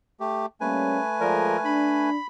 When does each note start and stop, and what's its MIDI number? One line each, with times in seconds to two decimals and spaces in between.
0.20 0.46 57
0.20 0.46 67
0.61 0.99 55
0.61 2.10 57
0.61 0.99 58
0.61 0.99 61
0.61 2.10 71
0.61 2.10 80
1.21 1.57 53
1.21 1.53 56
1.21 1.53 69
1.21 1.57 70
1.21 1.53 74
1.65 2.16 62
1.65 2.27 83